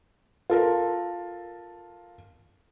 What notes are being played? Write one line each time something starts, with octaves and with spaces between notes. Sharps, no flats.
F4 A4 A#4